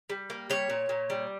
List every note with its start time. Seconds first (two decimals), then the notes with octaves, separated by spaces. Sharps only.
0.10 G3
0.30 A#3
0.50 G3 C#5
0.70 A#2
0.89 A#2
1.10 G3